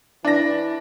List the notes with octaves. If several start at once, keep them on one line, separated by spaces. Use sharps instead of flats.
E3 D4 A#6